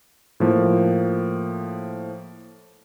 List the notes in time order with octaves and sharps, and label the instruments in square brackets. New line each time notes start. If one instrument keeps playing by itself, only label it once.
[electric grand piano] A2 F3 A#3